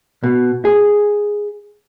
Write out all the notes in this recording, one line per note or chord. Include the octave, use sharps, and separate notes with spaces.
B2
G#4